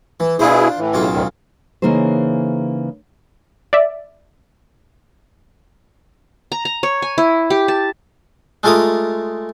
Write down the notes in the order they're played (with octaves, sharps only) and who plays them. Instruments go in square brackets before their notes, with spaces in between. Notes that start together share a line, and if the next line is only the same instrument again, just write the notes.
[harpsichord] E3
[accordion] B2 E4 G#4 [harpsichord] D4 F4 C5
[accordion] A2 E3
[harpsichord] B1 C#3 F4
[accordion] D2 A2 D#3
[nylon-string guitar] C#3 E3 A#3 D#4 G#4 C5
[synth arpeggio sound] D5 E5
[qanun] A#5
A#5
C#5
G#5
E4
G4
A5
[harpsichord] G#3 A3 F4 A#4 D6 D#6